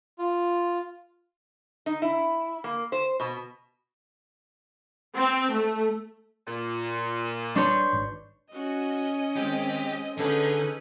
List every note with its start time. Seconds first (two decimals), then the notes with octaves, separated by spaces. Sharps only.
0.19 F4
1.86 D#4
2.02 E4
2.64 A#3
2.92 C5
3.20 B2
5.15 C4
5.53 A3
6.47 A#2
7.55 G3 D4 B4 C#5 C6 C#6 G6
7.93 G#1
8.52 C#4 F#4 D#5
9.36 D#3 G#3 C4 G4
10.18 D3 C#4 D#4 G#4 A4 B4